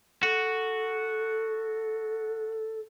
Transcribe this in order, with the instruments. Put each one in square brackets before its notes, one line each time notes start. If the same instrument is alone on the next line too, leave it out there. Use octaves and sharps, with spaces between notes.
[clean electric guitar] F#4 [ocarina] A4